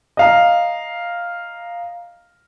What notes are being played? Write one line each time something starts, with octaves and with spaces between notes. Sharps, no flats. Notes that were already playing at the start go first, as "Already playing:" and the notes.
D#5 F5 A#5